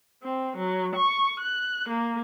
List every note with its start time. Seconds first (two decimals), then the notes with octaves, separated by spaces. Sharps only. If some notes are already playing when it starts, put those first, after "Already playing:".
0.23 C4
0.57 F#3
0.94 C#6
1.40 F#6
1.87 A#3